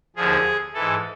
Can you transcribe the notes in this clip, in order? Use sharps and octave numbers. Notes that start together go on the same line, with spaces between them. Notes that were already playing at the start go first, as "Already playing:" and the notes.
D#2 D3 F3 G#4
G#2 E3 A4